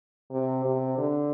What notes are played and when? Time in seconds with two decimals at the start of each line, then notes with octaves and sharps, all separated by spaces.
0.31 C3
0.65 C3
0.98 D3